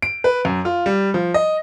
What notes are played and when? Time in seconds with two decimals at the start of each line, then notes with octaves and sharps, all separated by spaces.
0.02 D7
0.24 B4
0.45 F#2
0.65 F4
0.86 G3
1.14 F3
1.34 D#5